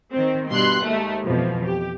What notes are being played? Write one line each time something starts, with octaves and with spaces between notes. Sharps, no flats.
D#3 C4
G2 B2 C6 F#6
D#2 G#3 A3
F2 B2 E3 F3
G4